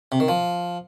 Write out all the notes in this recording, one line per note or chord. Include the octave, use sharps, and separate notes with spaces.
C3
D#3
F3